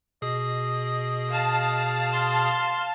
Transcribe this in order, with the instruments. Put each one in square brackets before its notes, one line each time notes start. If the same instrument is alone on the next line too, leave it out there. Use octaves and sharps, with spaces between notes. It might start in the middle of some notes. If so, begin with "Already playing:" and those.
[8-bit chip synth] B2 G#4 D#6 [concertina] D#5
[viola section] F5 A5
[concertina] C6